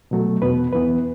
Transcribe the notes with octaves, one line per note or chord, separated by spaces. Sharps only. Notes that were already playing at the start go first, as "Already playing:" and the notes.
B2 F#3 A3
E2 B2 B3 B4
E2 E3 B3 B4